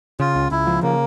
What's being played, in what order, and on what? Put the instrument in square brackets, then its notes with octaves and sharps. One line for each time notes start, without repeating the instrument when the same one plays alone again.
[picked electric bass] C#3 [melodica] F4
[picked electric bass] C#2
[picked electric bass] C#2 [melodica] E4
[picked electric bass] F3
[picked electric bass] C#3 [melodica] A#3